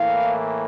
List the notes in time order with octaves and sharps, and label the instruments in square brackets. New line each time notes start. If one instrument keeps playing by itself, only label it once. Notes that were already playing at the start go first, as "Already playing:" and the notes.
Already playing: [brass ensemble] A2 E3 A#3 F5